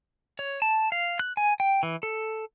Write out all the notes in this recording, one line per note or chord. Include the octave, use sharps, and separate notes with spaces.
C#5
A5
F5
F#6
G#5
G5
E3
A4